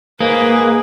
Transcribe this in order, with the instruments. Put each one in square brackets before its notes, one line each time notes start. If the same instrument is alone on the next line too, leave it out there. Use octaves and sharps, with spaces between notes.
[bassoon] G#2 [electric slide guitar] A#3 [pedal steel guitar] G#4 [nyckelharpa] B4